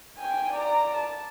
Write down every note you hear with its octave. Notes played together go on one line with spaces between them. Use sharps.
G5 G#5
D5 A#5
A5